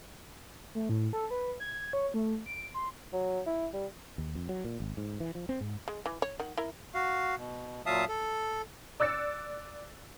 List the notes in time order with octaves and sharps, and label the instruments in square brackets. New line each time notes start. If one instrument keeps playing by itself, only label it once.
[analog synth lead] A3
A2
A4
B4
G#6
C#5
A3
D7
C6
[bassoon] F#3
E4
G3
[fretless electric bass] D#2
F2
F#3
A#2
G#1
G#2
E3
F3
C4
G#2
[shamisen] G#3
E3
C#5
D#3 F#5
E4 A#4
[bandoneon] F#4 F5
B2
A#2 F#3 E5 F5 A5 D#6
A4
[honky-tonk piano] D5 E6 F#6 A6 C#7